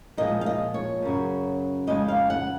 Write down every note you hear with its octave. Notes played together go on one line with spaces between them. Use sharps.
A#2 F3 G#3 D#5
F5
D#5
C#5
F#2 C#3 F#3
F2 C#3 G#3 D#5
F5
F#5